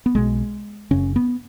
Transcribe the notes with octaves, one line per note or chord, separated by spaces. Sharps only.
B3
B1 B2 G#3
F#1 F#2 C#3 C#4
B3